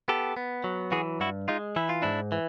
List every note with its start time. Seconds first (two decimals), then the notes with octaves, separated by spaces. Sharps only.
0.08 B3 G4 A4
0.37 B3
0.64 F#3
0.92 E3 F#4 G#4
1.20 G2 E4 F#4
1.48 G#3 D#4 F4
1.76 E3 E4
1.89 F4
2.02 G#2 D4 E4
2.32 E3